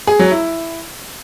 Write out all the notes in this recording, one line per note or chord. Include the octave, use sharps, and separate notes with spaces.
G#4
F#3
E4